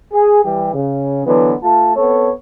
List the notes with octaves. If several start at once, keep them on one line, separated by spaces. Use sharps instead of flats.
G#4
E3 G3 G4
C#3
D3 E3 F#3 B3
A3 F4 A5
B3 C4 A4 C#5